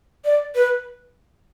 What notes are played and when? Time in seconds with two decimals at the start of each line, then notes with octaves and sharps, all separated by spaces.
0.24 D5
0.55 B4